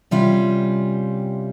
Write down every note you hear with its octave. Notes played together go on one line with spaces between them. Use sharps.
C3 G3 C#4 F4